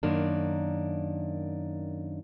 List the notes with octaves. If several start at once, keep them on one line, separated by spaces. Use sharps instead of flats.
F#2 D#3 A#3 D4